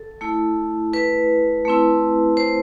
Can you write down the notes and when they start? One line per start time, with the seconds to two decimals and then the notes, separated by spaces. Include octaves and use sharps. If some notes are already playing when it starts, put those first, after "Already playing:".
Already playing: A4
0.21 A3 E4
0.93 B4
1.65 A3 C4 E4
2.37 C5